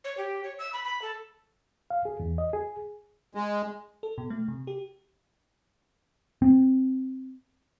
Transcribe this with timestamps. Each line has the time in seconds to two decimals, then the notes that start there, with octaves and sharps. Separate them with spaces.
0.04 C#5
0.17 G4
0.44 C#5
0.59 E6
0.73 B5
0.84 B5
1.02 A4
1.90 F5
2.05 G#4
2.20 E2
2.38 D#5
2.53 G#4
3.35 G#3
4.03 A4
4.18 B2
4.30 A3
4.48 C3
4.67 G4
6.42 C4